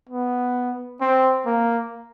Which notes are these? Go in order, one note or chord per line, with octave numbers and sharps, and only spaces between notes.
B3
C4
A#3